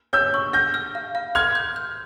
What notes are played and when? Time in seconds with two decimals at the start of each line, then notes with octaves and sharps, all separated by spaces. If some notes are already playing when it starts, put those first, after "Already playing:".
0.13 C#5 E6 G6
0.34 C#6
0.53 F6 G6 A#6
0.74 F6
0.95 F5
1.15 F5
1.35 C6 F6 G#6
1.55 G6
1.76 G6